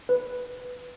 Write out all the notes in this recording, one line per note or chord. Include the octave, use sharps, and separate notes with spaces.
B4